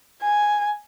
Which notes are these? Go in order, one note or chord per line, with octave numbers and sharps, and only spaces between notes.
G#5